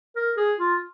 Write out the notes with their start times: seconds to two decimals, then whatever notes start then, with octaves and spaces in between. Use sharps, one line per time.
0.16 A#4
0.37 G#4
0.59 F4